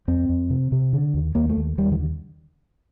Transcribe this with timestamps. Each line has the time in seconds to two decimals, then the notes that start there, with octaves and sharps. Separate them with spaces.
0.08 F2 C4
0.29 F2
0.50 C3
0.72 C3
0.93 D3
1.14 D#2
1.35 D#2 A#3
1.50 A3
1.57 D#2
1.77 D#2 G3
1.92 D#3
2.00 D3